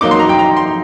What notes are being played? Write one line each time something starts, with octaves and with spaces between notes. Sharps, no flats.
F#3 A#3 D#4 D6
C6
A#5
G5
A#5
C6